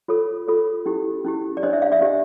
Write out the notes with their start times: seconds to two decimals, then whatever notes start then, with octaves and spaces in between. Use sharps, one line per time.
0.08 F4 A4 C#5
0.48 F4 A4 C#5
0.86 C#4 E4 G4
1.25 C#4 E4 G4
1.57 D5
1.63 D4 G4 C5 C#5 D#5
1.73 D5 E5
1.82 D#5 F5
1.92 D5 E5
2.01 D4 G4 C5